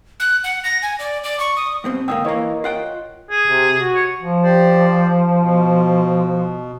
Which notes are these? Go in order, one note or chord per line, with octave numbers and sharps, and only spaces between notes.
F#6
F#5
A#6
G#5
D5
D5
C#6
D#6
G2 B2 C4
G#2 D3 A#3 G5 D#6 E6
E3 A#3 A#4 C#5 D#5
F4 F#5 G5
G#4
C3
F#4
C#5
F3
G4 C5 D5
B2